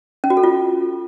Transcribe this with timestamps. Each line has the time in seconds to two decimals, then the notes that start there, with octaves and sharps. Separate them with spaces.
0.24 C#4
0.30 F#4
0.37 A4
0.44 F4